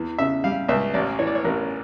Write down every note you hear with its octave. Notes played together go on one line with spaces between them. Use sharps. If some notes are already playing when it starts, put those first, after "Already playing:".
Already playing: E2 E3
C#3 E5
G3 F5
C#2 E5
A1 D5
E3 C#5
D5
C#5
A1 A#4